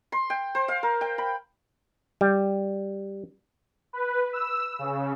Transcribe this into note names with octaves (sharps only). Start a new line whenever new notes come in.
C6
G5
C5
F5
A#4
G5
B5
G3
B4
E6
C#3